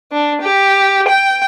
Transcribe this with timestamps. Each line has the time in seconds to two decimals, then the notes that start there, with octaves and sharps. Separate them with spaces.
0.12 D4
0.42 G4
1.07 G5